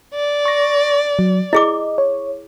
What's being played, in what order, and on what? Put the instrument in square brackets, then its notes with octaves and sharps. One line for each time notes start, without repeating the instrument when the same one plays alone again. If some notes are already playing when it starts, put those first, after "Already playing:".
[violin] D5
[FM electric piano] C#6 A#6
F#3
[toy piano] E4 G#4 D6 [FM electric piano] D#5
[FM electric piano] C#5